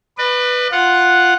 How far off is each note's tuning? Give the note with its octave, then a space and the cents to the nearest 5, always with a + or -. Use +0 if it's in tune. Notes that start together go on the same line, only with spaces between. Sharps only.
B4 +0 D5 +45
F4 +0 F#5 +0